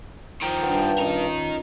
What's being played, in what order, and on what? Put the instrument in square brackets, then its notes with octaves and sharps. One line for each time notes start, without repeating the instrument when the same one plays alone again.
[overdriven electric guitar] D#3 F3 [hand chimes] G5 A#5
[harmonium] G2 [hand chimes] B4 F#5 G5
[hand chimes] C#4 F4 [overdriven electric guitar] D#4 A#4